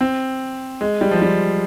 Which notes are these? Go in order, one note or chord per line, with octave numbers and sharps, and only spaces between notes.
C4
G#3
G3
F3
G3